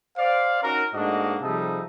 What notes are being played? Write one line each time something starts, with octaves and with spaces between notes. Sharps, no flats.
C5 D5 F5
C#4 D#4 F#4 A#4
G#2 A3 A#3 D4 F#4 D#5
C3 F3 G3 D#4 G#4 A4